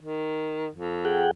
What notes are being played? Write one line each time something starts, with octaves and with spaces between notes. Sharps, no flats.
D#3
F2
G#4 F#5 G5